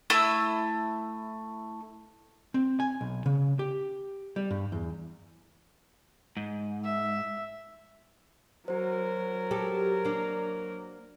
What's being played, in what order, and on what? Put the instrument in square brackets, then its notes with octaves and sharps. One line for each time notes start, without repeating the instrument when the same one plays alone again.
[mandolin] A3 E4 E6
[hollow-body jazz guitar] C4
G#5
B1
C#3
G4
G3
G2
E2
[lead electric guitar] G#2
[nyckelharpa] E5
[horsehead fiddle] F#3 A#4 [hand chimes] F#4 C5
[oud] G4 A4
A#3 D4